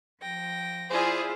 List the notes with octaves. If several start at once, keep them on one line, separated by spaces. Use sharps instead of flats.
F3 G5 A#6
E4 F4 G#4 C5 D5